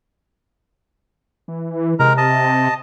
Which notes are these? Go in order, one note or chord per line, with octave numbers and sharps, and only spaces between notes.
E3
C3 G#3 A#4 A#5
D#5 A5